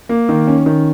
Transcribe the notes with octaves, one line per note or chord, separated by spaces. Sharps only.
A#3
D#3
C#4
D#3